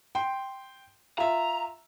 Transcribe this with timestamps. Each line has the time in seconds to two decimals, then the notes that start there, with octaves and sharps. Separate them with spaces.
0.15 G5 C6
1.18 F4 E5 A#5